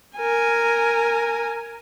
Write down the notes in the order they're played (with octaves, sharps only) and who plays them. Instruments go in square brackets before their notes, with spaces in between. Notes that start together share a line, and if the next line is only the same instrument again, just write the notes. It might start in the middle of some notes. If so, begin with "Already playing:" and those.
[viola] A#4 G#5